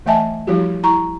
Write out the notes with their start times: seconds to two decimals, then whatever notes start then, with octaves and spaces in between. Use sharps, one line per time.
0.06 E3 A3 D#5 E5 G#5 A5
0.47 F3 G3 E4 F#4 G4
0.83 E4 A#5 C#6